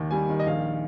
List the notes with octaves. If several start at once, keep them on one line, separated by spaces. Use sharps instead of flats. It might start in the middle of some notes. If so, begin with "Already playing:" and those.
Already playing: D#2 D#3
G3 G#5
D#3
D#5
A#1 F5